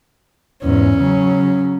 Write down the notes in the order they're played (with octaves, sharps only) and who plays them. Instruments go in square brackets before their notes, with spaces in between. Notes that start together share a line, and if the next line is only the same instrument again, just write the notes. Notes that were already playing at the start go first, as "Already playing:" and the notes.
[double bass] E2 G#2 [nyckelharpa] C#4
[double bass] C#3 F#3